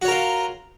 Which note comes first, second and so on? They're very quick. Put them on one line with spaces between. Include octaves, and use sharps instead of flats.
F#4 C#5 A#4 F4